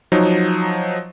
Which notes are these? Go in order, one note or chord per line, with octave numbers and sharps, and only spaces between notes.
F3 F#3 D#4